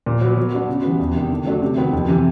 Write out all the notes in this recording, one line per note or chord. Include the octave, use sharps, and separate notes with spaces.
A#2
F#3 B3
F#3
B3 D4 F#4
C#3
E3 G3 B3
E2
C3 D#3 G3
D3
F#3 A3 D4
C3
D#3 F#3 B3
F2
C3 E3